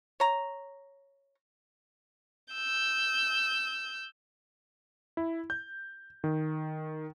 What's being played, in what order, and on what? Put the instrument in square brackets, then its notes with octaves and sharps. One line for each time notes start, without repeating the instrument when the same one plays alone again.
[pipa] C#5 A#5
[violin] E6 G6
[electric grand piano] E4
G6
D#3